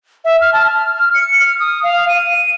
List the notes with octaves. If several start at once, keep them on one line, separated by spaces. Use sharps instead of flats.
E5
F6
A5
F6
C#7
F6
D#6
F5
D#7